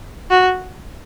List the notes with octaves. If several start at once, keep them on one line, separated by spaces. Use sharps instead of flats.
F#4